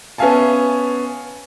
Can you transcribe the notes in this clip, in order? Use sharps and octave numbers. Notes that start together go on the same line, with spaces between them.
B3 C#4 E5 F5 G#5 A5